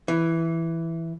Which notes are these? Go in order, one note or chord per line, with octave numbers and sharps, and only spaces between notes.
E3